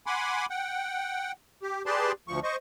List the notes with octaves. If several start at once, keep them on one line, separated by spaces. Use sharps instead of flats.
F#5 G#5 B5 C6 D6
F#5 G5
G4
G4 G#4 B4 D5 A5 C6
D2 F3 C#6
C5 D#5 C#6